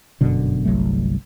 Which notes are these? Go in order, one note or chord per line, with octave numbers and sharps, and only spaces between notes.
G1 F#2 B2 D3
G1 C2 F#3 A3